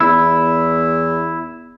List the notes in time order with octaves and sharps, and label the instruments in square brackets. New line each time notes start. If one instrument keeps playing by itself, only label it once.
[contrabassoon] E2 [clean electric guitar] E4